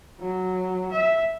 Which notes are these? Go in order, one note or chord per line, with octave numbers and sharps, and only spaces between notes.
F#3
E5